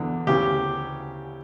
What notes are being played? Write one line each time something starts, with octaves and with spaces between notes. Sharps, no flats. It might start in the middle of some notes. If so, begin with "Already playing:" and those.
Already playing: E2 D3
D2 C#3 E3 G4